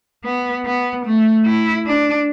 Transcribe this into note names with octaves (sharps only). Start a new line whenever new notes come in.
B3
B3
A3
E4
D4